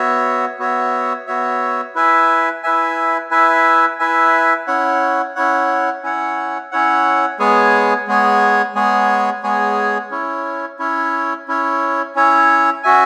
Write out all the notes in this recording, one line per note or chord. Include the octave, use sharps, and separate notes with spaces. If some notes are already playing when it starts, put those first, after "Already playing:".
Already playing: B3 F#4 C#5 E5
B3 F#4 C#5 E5
B3 F#4 C#5 E5
E4 B4 E5 G#5
E4 B4 E5 G#5
E4 B4 E5 G#5
E4 B4 E5 G#5
C#4 E4 C#5 F#5
C#4 E4 C#5 F#5
C#4 E4 C#5 F#5
C#4 E4 C#5 F#5
G#3 B3 G#4 C#5 G#5
G#3 B3 G#4 C#5 G#5
G#3 B3 G#4 C#5 G#5
G#3 B3 G#4 C#5 G#5
C#4 E4 C#5
C#4 E4 C#5
C#4 E4 C#5
C#4 E4 C#5
C#4 F#4 E5 G#5